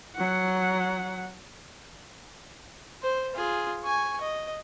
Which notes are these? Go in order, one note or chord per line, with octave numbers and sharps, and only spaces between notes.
F#3 F#5
C5
F4 G#4
G#5 C#6
D#5